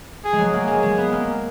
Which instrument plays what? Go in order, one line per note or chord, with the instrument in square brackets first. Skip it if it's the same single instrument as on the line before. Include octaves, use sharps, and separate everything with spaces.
[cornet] G#4
[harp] G#3
F#3
[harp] A#3 [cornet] G#4
[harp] G#3
G#3
B3
A#3